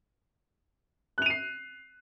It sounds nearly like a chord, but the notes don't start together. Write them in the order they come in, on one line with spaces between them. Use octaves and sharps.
F#6 F7 D#7 C7